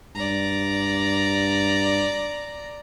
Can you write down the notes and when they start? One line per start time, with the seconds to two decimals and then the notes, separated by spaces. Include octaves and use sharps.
0.15 G2 D5 A#5